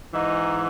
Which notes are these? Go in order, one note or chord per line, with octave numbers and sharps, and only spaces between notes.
G#2 E3 D#4